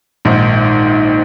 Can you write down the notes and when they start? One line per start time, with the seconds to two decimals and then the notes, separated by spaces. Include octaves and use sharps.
0.25 A#1 G#2 D#3